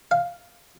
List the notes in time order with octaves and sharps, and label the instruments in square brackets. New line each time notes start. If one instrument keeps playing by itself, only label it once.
[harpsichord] F5